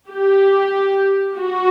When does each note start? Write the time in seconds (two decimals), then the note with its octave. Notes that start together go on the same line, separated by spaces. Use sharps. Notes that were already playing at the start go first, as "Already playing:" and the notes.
0.09 G4
1.38 F#4